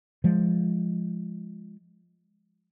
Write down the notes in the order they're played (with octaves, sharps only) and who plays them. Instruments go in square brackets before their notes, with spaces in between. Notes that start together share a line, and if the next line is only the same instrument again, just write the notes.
[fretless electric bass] F3 G#3